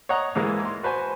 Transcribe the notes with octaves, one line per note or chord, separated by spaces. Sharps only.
C#5 D#5 F#5 A#5
G#2 E3 G#3 A#3
C6
F#4 B4 C5 G#5